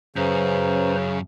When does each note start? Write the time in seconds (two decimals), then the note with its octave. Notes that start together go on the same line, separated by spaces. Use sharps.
0.16 F#2 C#3 B4 C5 A#5